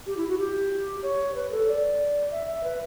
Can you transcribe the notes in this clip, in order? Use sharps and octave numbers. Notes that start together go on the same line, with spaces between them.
G4
E4
F#4
G4
C#5
B4
A4
D5
E5
E5
B4